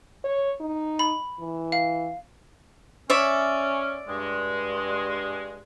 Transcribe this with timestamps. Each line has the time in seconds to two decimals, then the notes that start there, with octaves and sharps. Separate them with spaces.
0.24 C#5
0.60 D#4
0.99 B5
1.40 E3
1.72 F5
3.10 C#4 C#5 D5 E5
4.09 G2 G#3